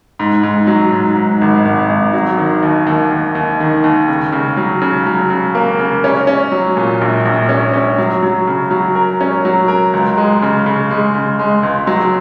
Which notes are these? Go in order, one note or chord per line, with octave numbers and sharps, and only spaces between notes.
G#2
G#2
F#3
G#2
G#2
G#1
G#1
G#1
F#3
D#3
D#2
D#2
D#2
D#2
D#3
D#2
C#3
C#3
F#3
C#3
F#3
C#3
A#3
C#3
C#4
C#4
F#3
A#2
A#1
A#1
C#4
C#4
F#3
F#3
C#3
F#3
A#4
C#4
F#3
A#4
C#2
G#3
C#3
C#3
G#3
C#3
G#3
C#2
F#3